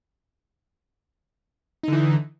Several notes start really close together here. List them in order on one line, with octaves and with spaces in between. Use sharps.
D#4 D3 E3